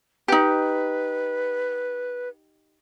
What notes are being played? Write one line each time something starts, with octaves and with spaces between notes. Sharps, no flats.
D#4 G4 B4